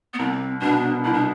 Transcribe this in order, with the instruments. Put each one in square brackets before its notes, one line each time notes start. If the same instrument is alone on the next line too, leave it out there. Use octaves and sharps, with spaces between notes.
[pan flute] B3
[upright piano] C2 [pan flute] C4
[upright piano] B2 B3 [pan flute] D4
[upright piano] C2 [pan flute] E4
[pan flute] D4